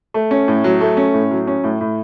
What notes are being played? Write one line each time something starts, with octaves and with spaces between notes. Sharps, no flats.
A3
C#4
A2
F#3
A3
C#4
A2
F#3
C#4
A2
A2